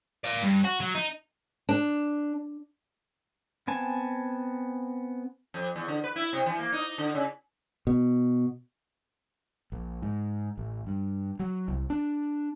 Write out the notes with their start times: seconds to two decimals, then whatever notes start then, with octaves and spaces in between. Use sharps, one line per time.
0.24 D5 F5
0.43 G2
0.65 F#4
0.80 F#3
0.95 D#4
1.69 D4
3.68 B3 C4 G#5 A5
5.54 F2
5.76 E2
5.88 D3
6.04 B4
6.16 E4
6.33 C3
6.46 E3
6.59 A#3
6.72 D#4
6.98 D3
7.15 C#3
7.87 B2
9.72 A#1
10.02 G#2
10.58 A1
10.87 G2
11.39 F#3
11.68 C2
11.90 D4